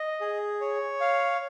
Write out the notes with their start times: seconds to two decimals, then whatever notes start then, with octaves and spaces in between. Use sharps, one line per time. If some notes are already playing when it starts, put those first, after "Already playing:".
Already playing: D#5
0.21 G#4
0.61 C#5
1.01 F5